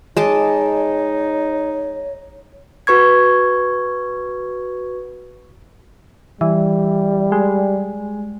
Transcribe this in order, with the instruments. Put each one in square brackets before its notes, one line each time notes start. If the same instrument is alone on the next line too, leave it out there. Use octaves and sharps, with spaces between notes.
[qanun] G#3 A5 D6 [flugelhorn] D#4 [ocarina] C#5
[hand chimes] F#4 B4 C#6 G#6
[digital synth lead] E3 [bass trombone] G3
[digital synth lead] G#3